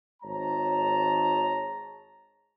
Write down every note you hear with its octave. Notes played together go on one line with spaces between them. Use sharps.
G#1 G#3 C#5 A5 A#5